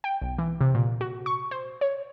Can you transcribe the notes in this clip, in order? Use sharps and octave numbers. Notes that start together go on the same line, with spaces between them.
G5
B1
E3
C3
A#2
F#4
C#6
C5
C#5